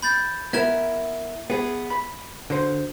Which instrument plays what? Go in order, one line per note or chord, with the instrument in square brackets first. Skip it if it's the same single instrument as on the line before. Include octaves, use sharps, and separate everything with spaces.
[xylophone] B5 G6 A6
[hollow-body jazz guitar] B3 E4 A#4 [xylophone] E5 G#6 E7
[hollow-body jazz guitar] B3 G#4
B5
D3 F#4 C5